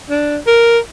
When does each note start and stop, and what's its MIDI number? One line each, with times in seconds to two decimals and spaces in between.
0.10 0.38 62
0.47 0.79 70